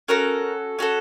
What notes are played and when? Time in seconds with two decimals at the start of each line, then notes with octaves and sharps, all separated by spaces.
0.08 C#4 F#4 A4 A#4
0.79 C#4 F#4 A4